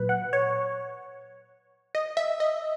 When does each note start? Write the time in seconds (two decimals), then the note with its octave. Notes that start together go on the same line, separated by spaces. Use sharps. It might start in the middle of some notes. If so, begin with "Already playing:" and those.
Already playing: A#2 F#3 B4
0.09 F#5
0.33 C#5
1.95 D#5
2.17 E5
2.40 D#5